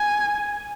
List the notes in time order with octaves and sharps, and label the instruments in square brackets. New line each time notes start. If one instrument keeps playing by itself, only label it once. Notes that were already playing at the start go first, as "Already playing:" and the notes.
Already playing: [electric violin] G#5